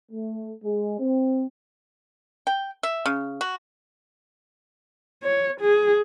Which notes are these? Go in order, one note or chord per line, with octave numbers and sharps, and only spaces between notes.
A3
G#3
C4
G5
E5
C#3
F#4
C#5
G#4